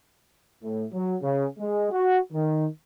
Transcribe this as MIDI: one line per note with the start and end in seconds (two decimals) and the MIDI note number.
0.63 0.85 45
0.92 1.16 54
1.22 1.45 49
1.59 1.89 56
1.91 2.17 66
2.33 2.65 51